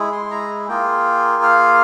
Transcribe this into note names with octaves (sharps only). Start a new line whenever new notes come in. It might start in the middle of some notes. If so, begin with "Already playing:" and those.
Already playing: G#3 E4 G#4
C6
A#5
A#3 F4 G#4 G5
F5